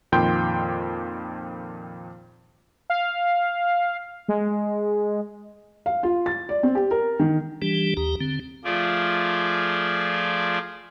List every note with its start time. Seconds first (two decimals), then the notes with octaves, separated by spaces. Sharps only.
0.12 F2 A#2 D#3 G5 C6 G6
2.90 F5
4.28 G#3
5.86 F5
6.03 F4
6.26 A6
6.49 D5
6.63 C4
6.75 G4
6.91 A#4
7.19 D#3
7.62 E3 G3 D4 G4
7.97 D#2 G4 A#5
8.21 D3 C4
8.64 F3 A3 F4 G#4 D5